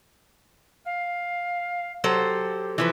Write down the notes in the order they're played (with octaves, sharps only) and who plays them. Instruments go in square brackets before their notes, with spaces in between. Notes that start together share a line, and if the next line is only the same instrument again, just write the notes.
[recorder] F5
[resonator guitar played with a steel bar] F#3 A4 C5 [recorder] G4
[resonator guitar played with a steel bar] E3 F3 B4